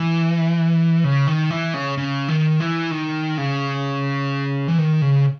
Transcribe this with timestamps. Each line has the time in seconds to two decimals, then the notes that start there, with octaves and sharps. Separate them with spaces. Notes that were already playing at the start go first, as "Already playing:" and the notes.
Already playing: E3
1.04 C#3
1.27 D#3
1.50 E3
1.74 C#3
1.98 C#3
2.28 D#3
2.60 E3
2.91 D#3
3.38 C#3
4.68 E3
4.78 D#3
5.02 C#3